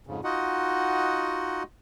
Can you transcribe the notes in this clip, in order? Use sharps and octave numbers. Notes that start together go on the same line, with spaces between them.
F2 G#2 C#3
D#4 F4 F#4 D#5 F#5